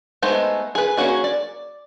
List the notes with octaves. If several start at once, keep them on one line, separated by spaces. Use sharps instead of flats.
G#3 A3 B3 D#4 C5
G#4 B4
A#3 C#4 F#4 G#4
D5